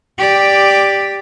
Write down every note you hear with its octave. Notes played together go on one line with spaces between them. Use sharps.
G4 D5